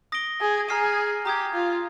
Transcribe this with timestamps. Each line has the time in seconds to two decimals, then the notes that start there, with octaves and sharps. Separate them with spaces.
0.12 D#6 A#6 D7 G7
0.41 G#4
0.69 G#4 A#5 F6 C7 D#7
1.25 G4 A#5 D#6 G#6
1.53 F4